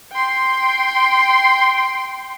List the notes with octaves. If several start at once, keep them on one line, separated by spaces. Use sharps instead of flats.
G5 C6